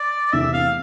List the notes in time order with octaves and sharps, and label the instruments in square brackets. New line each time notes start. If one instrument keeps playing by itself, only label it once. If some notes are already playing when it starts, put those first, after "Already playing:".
Already playing: [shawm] D5
[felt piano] E2 C3 E3 A3 C4 [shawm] E5
[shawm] F5